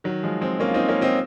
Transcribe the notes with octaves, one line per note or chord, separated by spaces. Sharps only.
D#3 F#3
F3 G#3
G#3 C4
A#3 C#4
F4
C4 D#4
A#3 C#4
C4 D#4